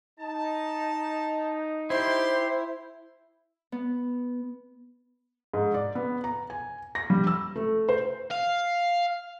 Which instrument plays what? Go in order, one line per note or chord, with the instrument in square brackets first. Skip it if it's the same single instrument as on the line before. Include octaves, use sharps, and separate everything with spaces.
[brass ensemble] D#4 [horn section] A5
[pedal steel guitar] E4 [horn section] G4 C6 [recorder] C5
[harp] B3
[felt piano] G#2
D5
B3
A#5
G#5
A#6
G3
E6
A3
C5
[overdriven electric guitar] F5